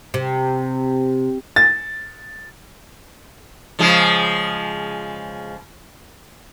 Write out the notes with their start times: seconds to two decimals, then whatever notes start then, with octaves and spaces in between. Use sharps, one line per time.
0.14 C3
1.56 A6
3.79 C#3 F3 G#3